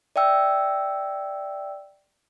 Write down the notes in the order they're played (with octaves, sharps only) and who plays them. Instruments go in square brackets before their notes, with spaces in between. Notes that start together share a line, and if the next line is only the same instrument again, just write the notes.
[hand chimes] D5 E5 G5 E6